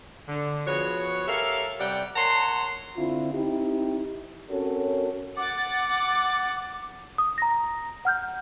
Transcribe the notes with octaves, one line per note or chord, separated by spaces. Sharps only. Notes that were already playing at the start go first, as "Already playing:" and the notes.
D3
F3 B3 F#4 G#4 C#5
G4 A4 A#4 C#5 E5 F5
C3 G3 D5 F#5 G5
A#4 C#5 F#5 A5 A#5 C6
D3 C4 E4 F4
C4 D#4 E4 G4
C4 C#4 F#4 A4 A#4 C#5
F#5 D6 A6
D#6
A#5 A#6
F#5 F6 G6